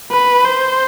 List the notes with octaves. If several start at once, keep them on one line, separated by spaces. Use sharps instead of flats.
B4
C5